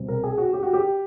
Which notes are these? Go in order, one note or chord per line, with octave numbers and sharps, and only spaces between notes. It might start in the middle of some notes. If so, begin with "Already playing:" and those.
Already playing: C2 B2 G3 C4
A#4
G#4
F#4
G4
F#4
G4